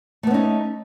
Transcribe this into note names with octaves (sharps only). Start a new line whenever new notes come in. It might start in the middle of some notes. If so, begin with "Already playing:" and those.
A3 B3 C#4 D#4